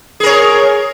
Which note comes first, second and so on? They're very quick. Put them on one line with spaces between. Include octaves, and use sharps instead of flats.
G#4 A#4 C#5